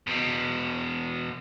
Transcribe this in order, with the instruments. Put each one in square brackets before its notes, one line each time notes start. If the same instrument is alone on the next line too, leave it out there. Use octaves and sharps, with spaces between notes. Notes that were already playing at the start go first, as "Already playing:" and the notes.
[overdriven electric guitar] E2 B2